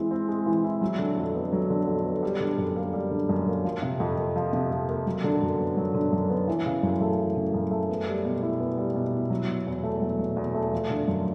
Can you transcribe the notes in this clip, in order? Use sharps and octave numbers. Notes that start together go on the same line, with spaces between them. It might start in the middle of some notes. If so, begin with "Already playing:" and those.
Already playing: E3 G#3 C4 E4
C4
G#3
E3
E4
F#3
D3
F2
B3
F#3
D3
F2
B3
G3
D3
F#2
A#3
G3
D3
F#2
A#3
F3
C3
F2
A#3
F3
C3
F2
A#3
F#3
D3
F#2
B3
F#3
D3
F#2
B3
E3
C#3
F#2
A3
E3
C#3
F#2
A3
B3
G3
B2
E4
B3
G3
B2
E4
F#3
B2
E2
A3
F#3
B2
E2
A3
F3
D3
F#2